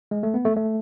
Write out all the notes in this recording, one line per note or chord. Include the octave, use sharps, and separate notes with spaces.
G#3
A3
B3
A3
A3